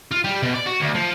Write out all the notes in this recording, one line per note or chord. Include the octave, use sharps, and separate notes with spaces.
F4
G3
B2
D5
F#4
D2
F3